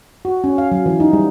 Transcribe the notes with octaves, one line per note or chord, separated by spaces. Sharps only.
F#4
C#4
F5
F#3
E3
D#4
G3